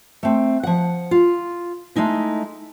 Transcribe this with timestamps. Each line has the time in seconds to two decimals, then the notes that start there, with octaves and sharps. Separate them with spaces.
0.23 A3 C4
0.63 F3 F#5
1.11 F4
1.96 G#3 A3 D#4 E4